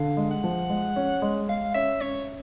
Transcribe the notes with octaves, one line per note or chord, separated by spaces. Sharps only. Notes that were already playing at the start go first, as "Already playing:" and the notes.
Already playing: D3 F5
G#3
F#5
F3
G#3
C#4
G#3
G#3 F5
C#4 E5
C#4 C#5